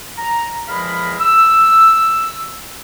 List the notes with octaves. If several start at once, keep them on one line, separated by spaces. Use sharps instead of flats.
A#5
E2 F3 G#3 A#4 F5 B5
E6